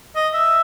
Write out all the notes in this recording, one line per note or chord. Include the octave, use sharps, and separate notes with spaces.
D#5
E5